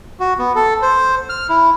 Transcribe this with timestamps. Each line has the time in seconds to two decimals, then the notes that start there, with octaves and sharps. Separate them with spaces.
0.20 F#4
0.39 B3
0.55 A4
0.82 C5
1.29 F6
1.49 E4